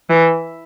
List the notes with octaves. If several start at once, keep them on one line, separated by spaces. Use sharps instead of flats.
E3